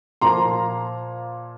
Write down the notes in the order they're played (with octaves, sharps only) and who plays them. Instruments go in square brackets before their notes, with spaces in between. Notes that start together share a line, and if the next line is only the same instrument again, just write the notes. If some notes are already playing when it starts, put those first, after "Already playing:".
[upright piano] A#2 F3 A#3 A#5 C6